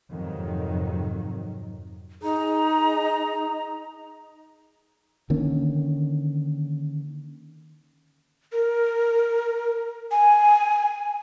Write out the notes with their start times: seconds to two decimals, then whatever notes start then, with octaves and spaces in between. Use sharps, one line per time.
0.10 F2 G#2 C3 D#3 F#3
2.23 D#4 G#4 A#5
5.30 D3 D#3 A#3 C#4
8.52 A#4
10.11 G#5